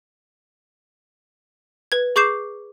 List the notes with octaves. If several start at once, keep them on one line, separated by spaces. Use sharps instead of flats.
B4 G#6
G#4 C#6 D6 G6 C7 E7